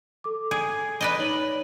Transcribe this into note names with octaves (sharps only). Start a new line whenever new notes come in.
A4 D6
G#4
B4 D5 D#5 D#6 F#6
D#4 C#5 F#7